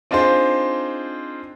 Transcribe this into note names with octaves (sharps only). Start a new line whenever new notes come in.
C4 D4 D#4 F4 G#4 C5